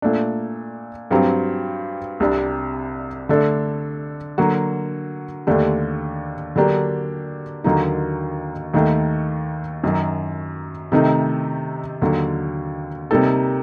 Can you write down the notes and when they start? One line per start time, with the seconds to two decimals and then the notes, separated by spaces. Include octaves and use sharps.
0.02 A#2 A3 D4
1.11 G2 F#3 C4 G4
2.20 C2 C3 G3 D4
3.29 D3 A3 D4 A4
4.38 D3 F#3 A#3 F#4
5.47 D#2 D3 A3 D4 G4
6.56 D3 F#3 A#3 D4 G4
7.64 D#2 D3 F#3 A#3 D#4
8.74 D#2 D#3 A3
9.83 F#2 D#3 F#3
10.92 C3 D#3 A3 D#4
12.02 D#2 D3 F#3
13.11 C3 G3 A#3 D#4 A4